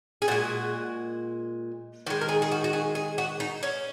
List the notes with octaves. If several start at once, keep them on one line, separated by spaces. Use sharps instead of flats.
G#4
A#2 G#3 F#4
D#3 G#3 F#4
A#4
G#4
G#4
F#4
F#4
G#4
G#4
F#4
D#4
C#4